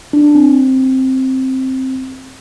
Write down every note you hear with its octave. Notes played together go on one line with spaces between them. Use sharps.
D4
C4